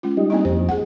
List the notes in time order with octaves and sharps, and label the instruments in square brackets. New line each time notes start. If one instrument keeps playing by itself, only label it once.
[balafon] G#3 C#4 F4
[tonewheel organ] G3 D#4
[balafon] A#3 C4 E4
[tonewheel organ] F2 [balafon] C5
[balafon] G#4 F#5